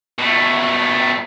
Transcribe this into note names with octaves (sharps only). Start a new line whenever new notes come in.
B2 A3